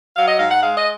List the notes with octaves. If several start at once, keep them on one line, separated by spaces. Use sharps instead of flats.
F#3 F5
D#5
G#2 F5
F#5
G#3 F5
D#5